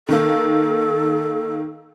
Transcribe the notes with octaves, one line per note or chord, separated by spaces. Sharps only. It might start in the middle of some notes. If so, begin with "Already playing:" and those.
D#3 A#3 A4